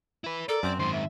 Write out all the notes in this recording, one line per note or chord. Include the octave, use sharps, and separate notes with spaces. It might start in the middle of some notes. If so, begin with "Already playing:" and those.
E4 B4
A4 A#4 D5
F#2 C4 C5
G#2 D#3 C6
E5